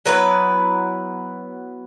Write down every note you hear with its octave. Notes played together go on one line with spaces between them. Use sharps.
F#3 B3 E4 B4